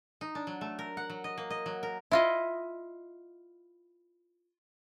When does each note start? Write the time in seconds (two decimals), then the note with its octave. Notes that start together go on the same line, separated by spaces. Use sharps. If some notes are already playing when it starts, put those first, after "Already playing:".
0.21 D#4
0.35 D4
0.47 F#3
0.61 A3
0.79 A#4
0.97 F#5
1.10 F#3
1.24 D#5
1.38 A#3
1.50 D#5
1.66 F#3
1.83 A#4
2.11 E4 F4 D#5